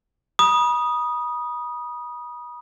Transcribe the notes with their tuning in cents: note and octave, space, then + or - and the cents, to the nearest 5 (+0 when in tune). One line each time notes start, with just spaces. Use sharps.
B5 -40 D#6 -5